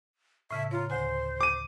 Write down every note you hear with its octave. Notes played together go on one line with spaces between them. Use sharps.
A2 C#3 E5 A5
F4 C#5 A#5
D2 D3 C5 G#5
D6 D#7